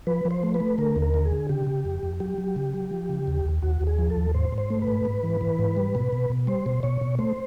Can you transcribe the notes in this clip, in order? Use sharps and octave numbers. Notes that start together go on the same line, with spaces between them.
F3 B4
F3
C5
A3
B4
A3
D3 A#4
D#2
A#4
D3
G#4
D3
C#3 G4
C#3
F2
F2
F#3 G4
F#3
C#3
F#3
F3
C#3
D#2
D#2
D#2 F#4
D#2
G#4
F3
A4
D#2
G#2 C5
G#2
C5
A3
B4
G#2
G#2
E3
E3
G#2
G3
B2
B2
B2
G3 C5
B2
B2 C#5
B2
A3 C5